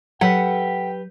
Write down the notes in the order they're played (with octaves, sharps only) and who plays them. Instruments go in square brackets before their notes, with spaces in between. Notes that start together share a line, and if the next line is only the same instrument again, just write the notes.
[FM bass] F#3 [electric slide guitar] G4 B4 [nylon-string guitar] A4 F#5 [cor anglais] G5